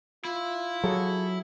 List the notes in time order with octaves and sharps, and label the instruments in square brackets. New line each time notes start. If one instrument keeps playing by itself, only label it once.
[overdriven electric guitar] E4 [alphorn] F4
[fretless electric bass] F#3 [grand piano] G#4 A4 C#5